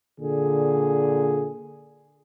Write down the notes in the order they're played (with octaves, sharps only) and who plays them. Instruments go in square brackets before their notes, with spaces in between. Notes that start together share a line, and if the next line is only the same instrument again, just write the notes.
[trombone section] A#2 D3 G#4